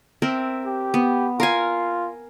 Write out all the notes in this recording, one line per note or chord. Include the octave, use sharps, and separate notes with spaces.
C4 A#4 E5
G4
B3
F4 A#4 F5 G#5